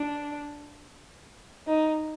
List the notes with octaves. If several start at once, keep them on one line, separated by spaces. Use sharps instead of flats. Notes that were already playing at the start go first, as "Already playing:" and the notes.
Already playing: D4
D#4